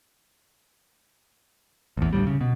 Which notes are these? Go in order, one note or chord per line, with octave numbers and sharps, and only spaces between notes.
A1 E2
D2 A2 G3
C#3
B2